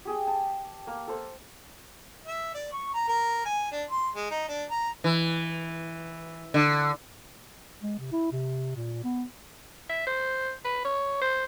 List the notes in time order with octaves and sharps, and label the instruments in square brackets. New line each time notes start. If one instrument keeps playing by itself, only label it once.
[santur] G4 G#4 G5
A5
A#3
A4 C5
[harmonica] E5
D5
C#6
A#5
A#4
G#5
D4
C6
G#3
D#4
D4
A#5
[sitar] E3
D3
[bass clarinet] G#3
C3
E4
C3
A#2
B3
[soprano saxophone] E5
C5
B4
C#5
C5